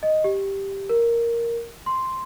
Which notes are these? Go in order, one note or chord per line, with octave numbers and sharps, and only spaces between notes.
D#5
G4
A#4
C6